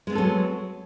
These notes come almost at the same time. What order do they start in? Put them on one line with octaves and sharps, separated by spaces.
G#3 B3 C4 A4 F#3